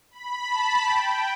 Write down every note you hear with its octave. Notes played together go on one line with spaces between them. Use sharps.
B5
A5
G5